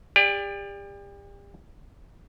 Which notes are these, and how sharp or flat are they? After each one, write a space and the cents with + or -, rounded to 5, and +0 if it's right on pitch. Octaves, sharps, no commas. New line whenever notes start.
G4 +35 D5 +0